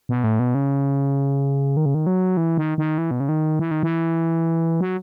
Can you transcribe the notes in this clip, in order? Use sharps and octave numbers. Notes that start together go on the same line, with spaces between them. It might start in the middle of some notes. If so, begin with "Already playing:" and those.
B2
A2
B2
C#3
D#3
C#3
D#3
F#3
E3
D#3
D#3
E3
B2
C#3
D#3
E3
D#3
E3
F#3